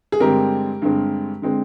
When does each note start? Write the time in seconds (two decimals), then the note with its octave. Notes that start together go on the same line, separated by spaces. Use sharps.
0.12 G#4
0.20 G2 D3 G#3 C4 G4 A#4
0.82 G2 D3 G#3 C4
1.42 D3 G#3 C4